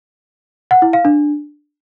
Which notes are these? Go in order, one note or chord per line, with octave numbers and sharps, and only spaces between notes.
F#5
E4
F5
D4